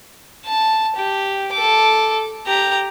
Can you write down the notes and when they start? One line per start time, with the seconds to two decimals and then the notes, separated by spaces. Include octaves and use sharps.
0.46 A5
0.96 G4
1.53 A4 D6
2.47 G4 A#5